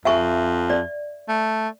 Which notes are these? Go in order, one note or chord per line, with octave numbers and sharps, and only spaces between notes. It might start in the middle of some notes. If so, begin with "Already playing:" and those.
F2 E5 G#5 C#6
D5
A3